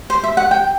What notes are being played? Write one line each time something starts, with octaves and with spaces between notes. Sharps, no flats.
C5
E5
F#5
G5